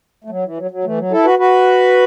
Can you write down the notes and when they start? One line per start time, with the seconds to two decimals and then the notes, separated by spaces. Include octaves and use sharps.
0.24 A3
0.30 F#3
0.44 E3
0.58 F#3
0.71 F#3
0.84 E3 A3
0.98 F#3
1.11 E4 A4
1.25 F#4 B4
1.39 F#4 B4